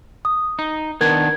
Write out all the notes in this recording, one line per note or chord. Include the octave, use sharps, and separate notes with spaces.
D#6
D#4
D#3 B3 D4 A#4 G#6